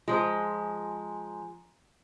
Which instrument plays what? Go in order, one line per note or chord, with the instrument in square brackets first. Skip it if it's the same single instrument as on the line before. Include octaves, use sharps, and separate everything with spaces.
[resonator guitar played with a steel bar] F3 G#3 [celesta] F4 C5 [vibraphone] G#5 A#5 C6